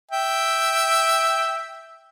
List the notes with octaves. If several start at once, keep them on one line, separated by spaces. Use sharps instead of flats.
E5 G5